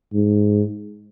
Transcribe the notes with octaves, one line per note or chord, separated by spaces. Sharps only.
G#2